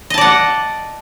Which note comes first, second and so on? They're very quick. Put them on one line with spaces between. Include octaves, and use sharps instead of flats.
D#5 A5 D5 F#5